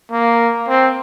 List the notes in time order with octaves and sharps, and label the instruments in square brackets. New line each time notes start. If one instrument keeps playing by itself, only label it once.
[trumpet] A#3
C4